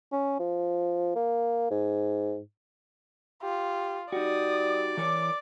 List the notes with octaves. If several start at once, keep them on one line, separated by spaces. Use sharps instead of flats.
C#4
F3
A#3
G#2
F4 G4
G3 D#4 F#4 D5 D#6
E3 A#4 C#5 D6